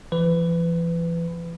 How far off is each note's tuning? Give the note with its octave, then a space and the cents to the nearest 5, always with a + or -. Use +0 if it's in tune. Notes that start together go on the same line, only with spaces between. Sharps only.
E3 +45 B4 +20